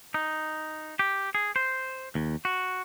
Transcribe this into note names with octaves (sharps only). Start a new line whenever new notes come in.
D#4
G4
G#4
C5
D#2
F#4